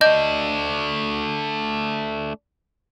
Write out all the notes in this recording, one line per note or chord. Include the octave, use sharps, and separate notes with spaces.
A3 D4 D#5 G6